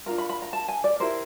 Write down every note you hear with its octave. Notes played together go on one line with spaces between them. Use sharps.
D4 F4 A#4 A#5
B5
B5
A#5
A5
G#5
D5
E4 G4 A#4 C5